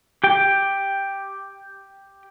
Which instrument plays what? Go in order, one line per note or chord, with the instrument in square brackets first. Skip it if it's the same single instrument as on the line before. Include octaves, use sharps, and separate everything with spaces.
[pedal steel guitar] G4 G5